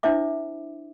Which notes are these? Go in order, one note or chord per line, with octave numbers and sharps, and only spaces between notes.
D4 E4 C5 E5 D6